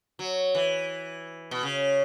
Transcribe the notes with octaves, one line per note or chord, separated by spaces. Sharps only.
F#3
E3
B2
C#3